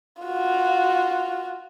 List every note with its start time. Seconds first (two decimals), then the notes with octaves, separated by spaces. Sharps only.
0.22 F4 F#4